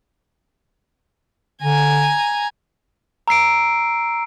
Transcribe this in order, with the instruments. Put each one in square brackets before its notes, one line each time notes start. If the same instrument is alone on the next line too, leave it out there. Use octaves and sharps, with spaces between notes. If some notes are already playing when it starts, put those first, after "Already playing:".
[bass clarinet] D3 [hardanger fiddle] G#5 A#5
[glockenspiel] A#5 E6 C7 D7